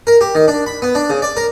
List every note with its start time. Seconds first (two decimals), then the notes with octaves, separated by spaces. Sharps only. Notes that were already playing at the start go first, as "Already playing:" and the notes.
0.07 A#4
0.21 G4
0.35 D#3
0.48 D4
0.66 B5
0.82 B3
0.95 D4
1.10 C#3
1.22 D5
1.37 A#4